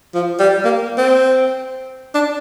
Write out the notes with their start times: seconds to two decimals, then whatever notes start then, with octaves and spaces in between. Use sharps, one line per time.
0.14 F3
0.39 G3
0.65 A#3
0.98 C4
2.15 D4